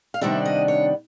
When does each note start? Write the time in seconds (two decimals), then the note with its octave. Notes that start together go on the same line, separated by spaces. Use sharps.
0.14 F5
0.21 C3 D#3 G3 B3 D4 E5
0.45 D#5
0.68 C#5